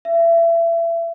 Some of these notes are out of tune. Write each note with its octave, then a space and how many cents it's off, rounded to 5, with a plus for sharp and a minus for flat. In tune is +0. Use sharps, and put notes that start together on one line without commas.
E5 +30